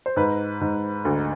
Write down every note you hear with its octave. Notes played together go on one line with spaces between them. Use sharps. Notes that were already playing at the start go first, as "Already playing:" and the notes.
C5
G#2 B4
G#2
D2